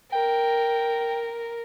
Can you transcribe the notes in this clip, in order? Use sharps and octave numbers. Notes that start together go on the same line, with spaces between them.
A#4 G5